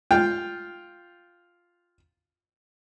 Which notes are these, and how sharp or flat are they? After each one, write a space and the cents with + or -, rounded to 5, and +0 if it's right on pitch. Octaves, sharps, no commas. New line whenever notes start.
F4 +0 G5 +0